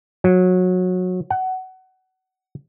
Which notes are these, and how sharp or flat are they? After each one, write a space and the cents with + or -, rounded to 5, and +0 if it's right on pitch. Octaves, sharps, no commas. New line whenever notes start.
F#3 -20
F#5 +20